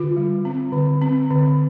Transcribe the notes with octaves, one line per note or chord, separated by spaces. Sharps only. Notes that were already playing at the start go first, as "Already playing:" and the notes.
Already playing: D3 F4
G3
C4
D3
C4
D3